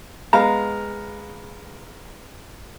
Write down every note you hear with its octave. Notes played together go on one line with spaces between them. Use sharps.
G#3 B3 F5 A#5